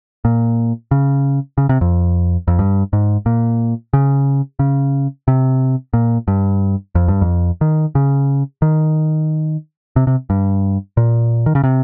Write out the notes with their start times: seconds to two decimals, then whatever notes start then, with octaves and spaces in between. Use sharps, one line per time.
0.25 A#2
0.91 C#3
1.58 C#3
1.69 C3
1.81 F2
2.48 F2
2.59 G2
2.93 G#2
3.26 A#2
3.93 C#3
4.59 C#3
5.28 C3
5.93 A#2
6.28 G2
6.95 F2
7.08 G2
7.21 F2
7.61 D#3
7.95 C#3
8.62 D#3
9.96 C3
10.07 C3
10.30 G2
10.97 A#2
11.46 D#3
11.55 C#3
11.64 C3